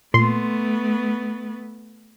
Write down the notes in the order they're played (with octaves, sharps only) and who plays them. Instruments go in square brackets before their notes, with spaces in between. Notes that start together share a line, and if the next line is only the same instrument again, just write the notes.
[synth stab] A#2 C6 [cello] A3 B3